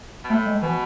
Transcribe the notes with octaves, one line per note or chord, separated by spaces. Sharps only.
B2
A2 A3
G#3
B2 E3